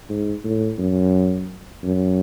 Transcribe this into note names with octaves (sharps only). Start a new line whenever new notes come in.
G#2
A2
F#2
F#2